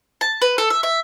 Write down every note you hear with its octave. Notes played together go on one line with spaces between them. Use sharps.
A5
B4
A4
E5
E5